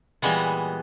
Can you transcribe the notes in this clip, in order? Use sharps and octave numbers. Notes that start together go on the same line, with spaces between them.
A#2 E3 G3 G#3 B3